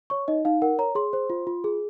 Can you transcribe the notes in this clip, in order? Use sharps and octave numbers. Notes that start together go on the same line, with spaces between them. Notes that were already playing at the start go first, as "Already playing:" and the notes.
C#5 C#6
D#4 D#5
D#4 F5
A#4 F#5
C#5 A#5
G#4 C6
C5
F4
F4
G#4